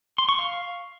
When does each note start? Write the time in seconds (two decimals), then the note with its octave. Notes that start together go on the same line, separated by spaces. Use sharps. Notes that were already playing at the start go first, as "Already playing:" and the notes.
0.18 C6
0.29 C#6
0.39 F5